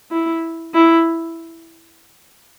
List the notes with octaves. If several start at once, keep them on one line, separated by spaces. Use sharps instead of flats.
E4
E4